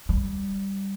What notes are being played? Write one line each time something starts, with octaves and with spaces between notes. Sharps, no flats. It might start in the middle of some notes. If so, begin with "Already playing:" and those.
G3